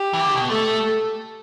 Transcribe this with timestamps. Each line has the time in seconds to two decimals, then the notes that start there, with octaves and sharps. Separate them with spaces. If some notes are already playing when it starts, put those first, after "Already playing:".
Already playing: G4
0.13 E3
0.20 D3
0.35 B2
0.49 A3 A4